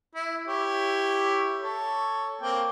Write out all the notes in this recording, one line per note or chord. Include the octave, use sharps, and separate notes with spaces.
E4
E4 G4 C#5
A4 C#5
A#3 C4 G5